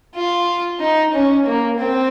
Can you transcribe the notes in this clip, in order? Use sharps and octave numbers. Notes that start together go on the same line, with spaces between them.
F4
D#4
C#4
A#3
C4